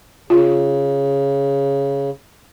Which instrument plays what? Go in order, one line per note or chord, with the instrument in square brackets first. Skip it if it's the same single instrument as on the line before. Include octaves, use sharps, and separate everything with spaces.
[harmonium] C#3 [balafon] F4